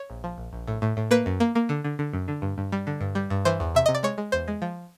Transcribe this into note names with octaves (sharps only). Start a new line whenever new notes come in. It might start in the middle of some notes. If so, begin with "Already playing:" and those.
Already playing: C#5
A#1
F3
A#1
A#1
A2
A2
A2
A#3 B4
F#2
A#3
A#3
D3
D3
D3
F#2
D3
G2
G2
G3
D3
G2
G3
G2
E3 C5
E2
C3 E5
C3 D#5
D5
G#3 C#5
G#3
E2 C5
G#3
F3